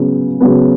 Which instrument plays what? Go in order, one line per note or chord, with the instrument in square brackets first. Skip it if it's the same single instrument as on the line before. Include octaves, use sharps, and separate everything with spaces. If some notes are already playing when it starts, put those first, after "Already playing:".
Already playing: [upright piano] C#3 F#3 B3
C#3 F#3 B3